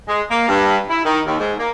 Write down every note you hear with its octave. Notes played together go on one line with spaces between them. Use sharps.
G#3
A#3
G2
E4
D#3
D#2
G#2
A#3